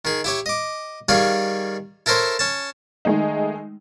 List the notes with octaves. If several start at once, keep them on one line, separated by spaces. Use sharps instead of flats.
D#3 G#4
E4 G4 C#5
D#5 D6
D#3 G3 G#4 C#5 F5
E4 A4 A#4 C5 C#5
C#4 A5
D#3 G#3 A3 D#4